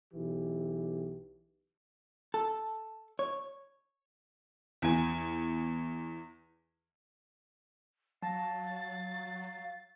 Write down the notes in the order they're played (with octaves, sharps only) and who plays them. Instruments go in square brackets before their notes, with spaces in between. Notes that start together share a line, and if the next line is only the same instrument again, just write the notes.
[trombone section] B1 E3 G4
[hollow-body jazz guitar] A4
C#5
[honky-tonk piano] E2 G#5
[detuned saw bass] F#3 [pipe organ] F5 [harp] A5 A#6 [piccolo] A6